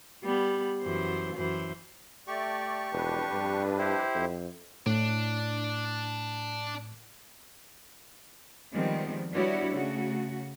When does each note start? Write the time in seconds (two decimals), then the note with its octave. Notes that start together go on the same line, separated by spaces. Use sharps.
0.24 G3 B3
0.82 F#2 E3 C5
1.35 F#2 E3 C5
2.27 A3 G4 D5 C#6
2.93 E1 F2 D4 B4
3.32 G2
3.78 E4 G4 C5
4.15 F2
4.86 A2 D4
8.73 D#3 F3 G3 G#3 B3 C4
9.32 G3 B3 D4 E4 F#4 C#5
9.74 C#3 A3 F#4